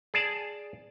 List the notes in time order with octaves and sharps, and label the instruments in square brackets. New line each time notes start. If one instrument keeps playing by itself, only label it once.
[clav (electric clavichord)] G#4 D5 A5